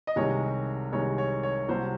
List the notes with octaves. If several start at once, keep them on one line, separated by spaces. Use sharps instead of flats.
D#5
C2 C3 D#3 G#3 C#5
C2 C3 D#3 G#3 C#5
C#5
C#5
C2 C3 F#3 C5